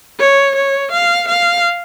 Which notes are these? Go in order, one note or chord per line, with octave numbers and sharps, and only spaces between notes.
C#5
C#5
F5
F5